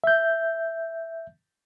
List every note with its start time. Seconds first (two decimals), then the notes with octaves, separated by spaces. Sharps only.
0.04 E5 G6